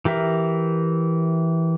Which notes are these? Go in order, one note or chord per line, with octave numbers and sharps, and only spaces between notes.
E3 G4 A#4 E5